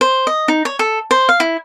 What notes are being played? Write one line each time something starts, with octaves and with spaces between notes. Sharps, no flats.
C5
D#5
D#4
C#5
A4
C5
F5
E4